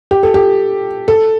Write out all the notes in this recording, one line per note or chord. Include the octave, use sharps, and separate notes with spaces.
G4
A4
G4
A4